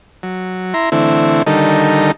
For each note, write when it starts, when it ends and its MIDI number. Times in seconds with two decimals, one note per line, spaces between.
0.23 0.74 54
0.74 0.90 64
0.74 0.90 82
0.74 0.90 84
0.92 1.43 50
0.92 1.43 52
0.92 1.43 57
0.92 1.43 60
0.92 1.43 64
1.46 2.12 50
1.46 2.12 51
1.46 2.12 55
1.46 2.12 63
1.46 2.12 69
1.46 2.12 70